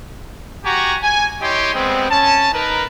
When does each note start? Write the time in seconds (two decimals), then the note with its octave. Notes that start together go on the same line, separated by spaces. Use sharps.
0.65 F#4 G4 F#5 G#5 A#5 C#6
1.02 G#5
1.41 E4 G4 C#5 D#5 G5 C6
1.74 G3 G#3 B3 C4
2.10 C#4 A5
2.53 D#4 A#4 B4